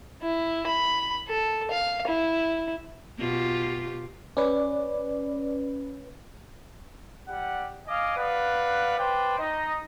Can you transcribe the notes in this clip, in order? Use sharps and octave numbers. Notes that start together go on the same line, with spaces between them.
E4
B5
A4
F5
E4
B2 F4 G4
C#4 B4 D5
G3 G4 F#5
D#5 F5 G#5 D6
B4 D5 F5 F#5
B4 C5 D5 G5
D#4 D#5